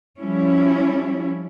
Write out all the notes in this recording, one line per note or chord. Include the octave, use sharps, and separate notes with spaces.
F3 G3 C#4 E4